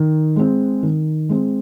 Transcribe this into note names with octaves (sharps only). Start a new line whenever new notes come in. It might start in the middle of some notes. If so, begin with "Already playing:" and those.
Already playing: D#3
G#3 C4
D#3
G#3 C4